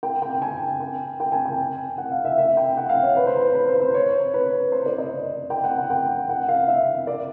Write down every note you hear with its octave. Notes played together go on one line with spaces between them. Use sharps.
G5
G5
G#5
G5
G5
G#5
G5
F#5
F5
E5
E5
G5
F#5
F5
C#5
B4
C5
B4
B4
C5
C5
C#5
B4
C5
D5
D#5
G5
F#5
F#5
G5
F#5
F5
E5
D5